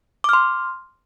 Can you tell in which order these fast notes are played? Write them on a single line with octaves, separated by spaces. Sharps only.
D6 F6 C6